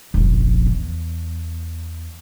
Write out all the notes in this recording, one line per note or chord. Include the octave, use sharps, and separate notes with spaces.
F1 A#1
E2